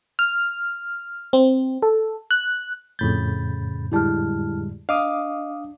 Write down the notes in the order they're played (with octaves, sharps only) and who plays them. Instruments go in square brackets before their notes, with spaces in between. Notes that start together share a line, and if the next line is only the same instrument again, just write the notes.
[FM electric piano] F6
C4
A4
F#6
[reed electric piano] F2 A2 G6 [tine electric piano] C#3 B5 A6
[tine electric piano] D3 G3 G#3 [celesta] E4 A5 F6
[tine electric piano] D4 [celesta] D#5 [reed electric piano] F5 D6 D#6